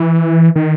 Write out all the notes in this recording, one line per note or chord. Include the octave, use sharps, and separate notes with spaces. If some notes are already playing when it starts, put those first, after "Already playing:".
Already playing: E3
D#3